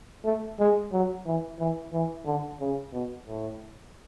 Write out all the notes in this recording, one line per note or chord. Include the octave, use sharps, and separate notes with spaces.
A3
G#3
F#3
E3
E3
E3
D3
C#3
B2
A2